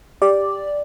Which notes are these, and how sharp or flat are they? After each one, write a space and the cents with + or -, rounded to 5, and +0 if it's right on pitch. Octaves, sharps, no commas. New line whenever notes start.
G4 +10 D5 +0